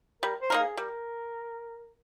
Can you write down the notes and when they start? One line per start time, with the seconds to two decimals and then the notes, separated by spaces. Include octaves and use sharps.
0.22 G3 A#4
0.40 C5
0.50 A#3 D#4 A#4
0.60 G#4
0.77 G3 A#4